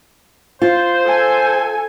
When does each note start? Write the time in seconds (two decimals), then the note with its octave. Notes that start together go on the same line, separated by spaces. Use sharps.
0.62 F4 C5
1.04 A4 G#5